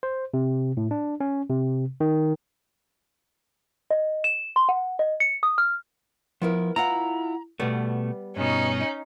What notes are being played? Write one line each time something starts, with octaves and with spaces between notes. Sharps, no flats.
C5
C3
A2
D4
C#4
C3
D#3
D#5
E7
C6
F#5
D#5
C#7
D#6
F6
F3 B3 E4 A#4
E4 F4 F#5 A#5
B2 G3 A3 B3
G2 B2 C#4 D#4